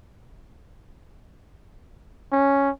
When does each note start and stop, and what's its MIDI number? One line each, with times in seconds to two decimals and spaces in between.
2.32 2.70 61